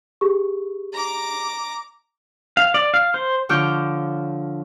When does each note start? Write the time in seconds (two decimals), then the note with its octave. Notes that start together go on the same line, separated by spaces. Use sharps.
0.21 G4 G#4 C#6
0.93 A#5 D6
2.57 F5
2.74 D5
2.94 F5
3.14 C5
3.49 D3 F3 C#5 D6 F6 G6